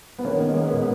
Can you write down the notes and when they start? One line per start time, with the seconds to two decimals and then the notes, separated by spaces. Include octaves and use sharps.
0.19 B3
0.25 D#3 A#3 C#4
0.40 G#3
0.57 B3
0.74 A#2